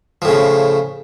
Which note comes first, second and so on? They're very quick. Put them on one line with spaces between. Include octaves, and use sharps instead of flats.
F3 A2 C#3